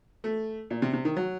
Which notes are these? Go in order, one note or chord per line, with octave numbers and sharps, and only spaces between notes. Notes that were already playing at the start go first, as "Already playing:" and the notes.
A3
A#2
C3
C3
D#3
F#3